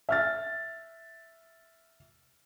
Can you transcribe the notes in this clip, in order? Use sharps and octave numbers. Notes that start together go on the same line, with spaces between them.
E5 F6 A6